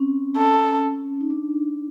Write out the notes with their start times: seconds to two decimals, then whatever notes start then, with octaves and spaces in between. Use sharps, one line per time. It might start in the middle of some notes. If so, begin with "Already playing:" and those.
Already playing: C4 C#4
0.37 A4
1.21 D#4
1.30 D4